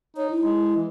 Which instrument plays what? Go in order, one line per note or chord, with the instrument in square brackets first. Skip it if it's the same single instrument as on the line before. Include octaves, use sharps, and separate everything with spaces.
[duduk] D#4 [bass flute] C#5
[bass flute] E4
[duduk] G#3
E3